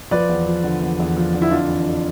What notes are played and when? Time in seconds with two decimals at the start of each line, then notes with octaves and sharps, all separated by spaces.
0.11 F3 B4 D5
0.29 E2
0.46 F3
0.64 D3
0.81 E2
0.99 E2
1.16 F3
1.33 D3
1.42 E4
1.51 F2 D4 F4
1.68 E3
1.86 F2